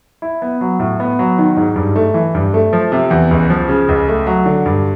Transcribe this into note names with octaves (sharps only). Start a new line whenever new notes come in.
E4
B3
F#3
A2
B3
F#3
D#3
G#2
G2
A3
E3
G2
A3
F3
C3
E2
C#2
F3
C#3
C#2
A3
F#3
D3
G2